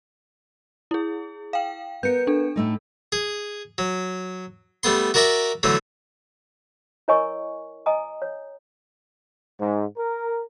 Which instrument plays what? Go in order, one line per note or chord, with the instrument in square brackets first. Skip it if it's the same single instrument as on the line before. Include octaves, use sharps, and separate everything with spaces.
[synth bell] E4 G#4
F5 G5
[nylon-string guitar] B3 A#4 [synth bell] G6 C#7
[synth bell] D4 A4
[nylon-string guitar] A2 A3 D#4
[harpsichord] G#4
F#3
G3 A3 B3 C6
F#4 A#4 D5 E5 A#5 D6
D3 E3 F#3 A3
[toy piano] E4 A#4 C#5 D#5 G#5 C#6
D#5 G#5 A#5 D#6
C#5
[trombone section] G#2
A#4